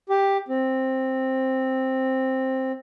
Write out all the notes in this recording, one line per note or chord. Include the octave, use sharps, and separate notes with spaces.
G4
C4